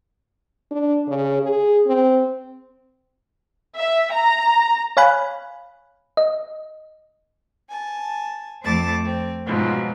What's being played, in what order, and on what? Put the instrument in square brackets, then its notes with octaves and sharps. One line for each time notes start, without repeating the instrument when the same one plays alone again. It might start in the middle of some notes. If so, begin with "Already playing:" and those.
[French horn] D4
C#3
G#4
C4
[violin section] E5
A#5
[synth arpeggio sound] C#5 F5 G#5 B5 F#6
D#5
[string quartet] G#5 A5
F2 A3 C5 A5 D6 A6
C4
G#2 B2 F3 F#3